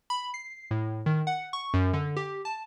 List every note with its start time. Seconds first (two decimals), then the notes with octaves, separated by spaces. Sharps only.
0.10 B5
0.34 C7
0.71 A2
1.06 D#3
1.27 F#5
1.53 C#6
1.74 F#2
1.93 D3
2.17 G4
2.45 A5